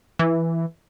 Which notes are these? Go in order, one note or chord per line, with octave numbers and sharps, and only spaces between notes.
E3